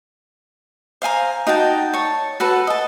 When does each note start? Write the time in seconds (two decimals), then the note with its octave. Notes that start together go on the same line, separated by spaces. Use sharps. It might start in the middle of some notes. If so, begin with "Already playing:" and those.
1.02 C5 F5 G#5 A#5
1.47 D#4 F#4 G5 A5
1.94 C#5 A5
2.40 F#4 A4 B4
2.67 D#5 A5